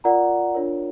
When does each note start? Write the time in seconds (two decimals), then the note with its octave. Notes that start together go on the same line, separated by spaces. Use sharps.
0.04 F4 A#4 D5 F#5 A#5
0.55 D4 F4 A#4 C#5